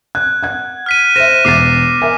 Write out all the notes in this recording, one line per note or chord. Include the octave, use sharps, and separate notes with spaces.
F#6 G#6
F#5 G#6
F6 B6 D#7
C5 E5 A#6 D#7 E7
E1 D6 A6 C7 D#7
A#4 E5 G#5